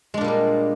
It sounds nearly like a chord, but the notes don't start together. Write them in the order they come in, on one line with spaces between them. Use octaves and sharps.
G#3 D4 A#2 G3 A#3